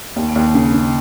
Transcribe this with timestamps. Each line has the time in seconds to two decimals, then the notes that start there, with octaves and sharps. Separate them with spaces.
0.16 D#2
0.36 D#2
0.54 C#3
0.73 C#3